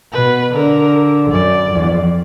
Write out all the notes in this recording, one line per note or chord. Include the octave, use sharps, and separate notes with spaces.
B2 B4
D3 A#4
F#2 D5
F2